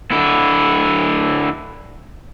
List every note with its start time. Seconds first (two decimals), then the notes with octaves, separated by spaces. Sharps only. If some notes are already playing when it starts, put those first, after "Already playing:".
0.11 D3 E4